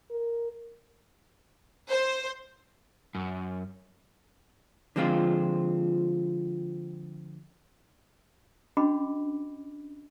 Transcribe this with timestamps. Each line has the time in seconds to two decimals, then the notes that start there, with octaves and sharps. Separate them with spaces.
0.10 A#4
1.89 C5
3.15 F#2
4.96 D3 F3 G#3 C4 F4
8.77 C#4 D4 F#4 D#5 B5 D6